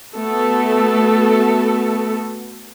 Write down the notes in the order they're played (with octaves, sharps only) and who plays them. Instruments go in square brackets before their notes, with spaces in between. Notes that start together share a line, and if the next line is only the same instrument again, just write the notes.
[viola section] A3 B3 F#4 A4